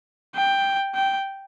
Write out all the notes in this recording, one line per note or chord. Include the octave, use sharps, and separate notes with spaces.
G5
G5